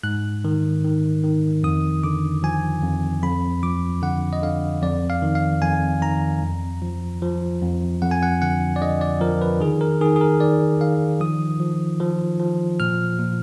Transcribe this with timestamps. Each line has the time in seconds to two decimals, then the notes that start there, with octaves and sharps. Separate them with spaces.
0.03 G#2 F#6
0.45 D#3
0.84 D#3
1.23 D#3
1.63 F2 D#6
2.04 D3 D6
2.43 F3 G#5
2.83 F2
3.23 F2 B5
3.63 F3 D6
4.02 D3 F#5
4.33 D#5
4.42 D3 F5
4.82 F2 D5
5.10 F5
5.22 D#3
5.35 F5
5.62 F2 G#5
6.02 D#3 A#5
6.42 F2
6.82 F3
7.22 F3
7.62 F2
8.02 F2 F#5
8.11 G#5
8.23 F#5
8.42 D3 F#5
8.76 D5
8.81 D3 D#5
9.01 D5
9.20 F3 A#4
9.42 B4
9.60 D#3 G#4
9.81 A#4
10.01 D#3 G#4
10.16 G#4
10.21 A#4
10.40 D#3 D5
10.80 D#3 F5
11.20 F3 D#6
11.60 F3
12.00 F3
12.39 F3
12.80 A#2 F6
13.19 A#2